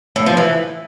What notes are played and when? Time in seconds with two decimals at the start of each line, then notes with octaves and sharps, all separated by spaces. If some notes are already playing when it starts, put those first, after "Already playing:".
0.16 A2
0.26 F3
0.37 E3